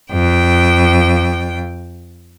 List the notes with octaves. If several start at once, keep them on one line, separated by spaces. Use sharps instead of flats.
F2 G5